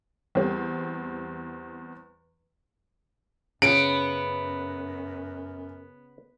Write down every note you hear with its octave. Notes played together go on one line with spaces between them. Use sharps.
E2 G3 C4
F#2 C#3 B3 D7